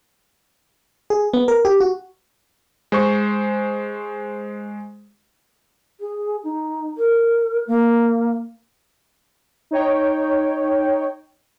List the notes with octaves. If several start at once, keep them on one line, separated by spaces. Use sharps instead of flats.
G#4
B3
A#4
G4
F#4
G#3 C5 C#6
G#4
D#4
A#4
A#3
D#4 C#5 G5